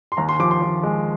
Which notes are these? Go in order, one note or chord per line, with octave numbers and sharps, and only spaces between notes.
C6
D#2 A#5
C6
F3 D6
C6
F3
G#3